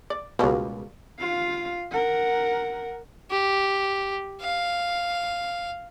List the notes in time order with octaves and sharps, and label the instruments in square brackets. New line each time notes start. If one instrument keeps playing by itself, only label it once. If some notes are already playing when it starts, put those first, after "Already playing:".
[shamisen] D5
[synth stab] C#2 B2 [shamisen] G3 A#3
[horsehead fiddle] F4 F5
A#4 F#5
[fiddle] G4
F5